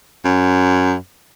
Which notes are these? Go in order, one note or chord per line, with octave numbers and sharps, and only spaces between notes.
F#2